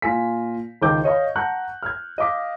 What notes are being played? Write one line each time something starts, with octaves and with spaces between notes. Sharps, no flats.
A#2 F4 G#5 B6
C#2 D#3 C5 G5 D6 G6
C#5 D#5 F5 C#6
F#5 A5 A#5 C#6 F#6 G6
F6 G#6
D#5 F5 D6 B6